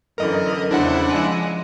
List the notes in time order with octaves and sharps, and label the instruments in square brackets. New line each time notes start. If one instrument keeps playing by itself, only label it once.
[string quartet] F#2 D3 E3 [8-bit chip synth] A#4 D#5
[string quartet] E2 C#3 C5 [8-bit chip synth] D4 E4 F#5
[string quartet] F3 G#3